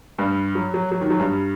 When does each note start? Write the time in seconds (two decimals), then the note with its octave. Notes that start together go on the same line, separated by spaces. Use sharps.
0.18 G2 G3
0.55 F#3
0.74 F#3
0.92 F#3
1.01 D#3
1.10 F#3
1.19 G2 G3